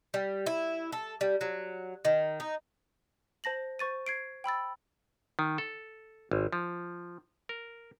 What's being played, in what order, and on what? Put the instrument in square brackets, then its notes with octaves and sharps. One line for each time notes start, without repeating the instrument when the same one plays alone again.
[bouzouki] G3
E4
A4
G3
F#3
D#3
D#4
[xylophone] C5 A5 A#6 F#7
C5 C#6 A6 D#7
G#6 C7 D7
G5 B5 E6 A6
[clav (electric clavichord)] D#3
A4
G#1
F3
A#4